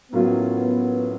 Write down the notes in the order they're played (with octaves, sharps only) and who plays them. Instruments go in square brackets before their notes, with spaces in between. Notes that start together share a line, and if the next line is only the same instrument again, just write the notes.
[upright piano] A2 F#3 A#3 C#4 F4 [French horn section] B3